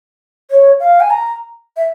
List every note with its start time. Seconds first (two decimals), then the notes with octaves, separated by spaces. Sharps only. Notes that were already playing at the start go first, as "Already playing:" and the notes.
0.51 C#5
0.80 F5
1.00 G#5
1.10 A#5
1.77 E5